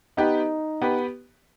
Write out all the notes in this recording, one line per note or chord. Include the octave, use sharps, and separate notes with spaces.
B3 D#4 G4 B4
B3 G4 B4